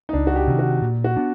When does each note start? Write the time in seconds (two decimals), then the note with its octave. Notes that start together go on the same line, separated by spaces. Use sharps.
0.09 D#4
0.13 C#2 D4
0.27 F#4
0.36 G4
0.47 C3 D#3
0.59 F#4
0.82 A#2
1.04 F#4
1.17 B3 D4